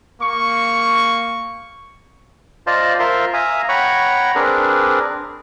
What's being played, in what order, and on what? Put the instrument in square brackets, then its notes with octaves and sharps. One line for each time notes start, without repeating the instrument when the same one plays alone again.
[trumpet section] A#3 C#6
[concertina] F4 C5 D5 D#5 F5 A5
F4 A#4 C5 E5 F5 C6
E5 F5 G#5 A#5 D#6
C#5 F#5 G5 A#5 B5 C#6
C4 D4 G#4 A#4 B4